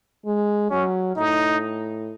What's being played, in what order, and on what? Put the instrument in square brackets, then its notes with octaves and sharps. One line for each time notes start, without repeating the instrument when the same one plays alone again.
[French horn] G#3
[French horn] F#3 [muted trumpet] C#4
[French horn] A2 [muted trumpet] D#4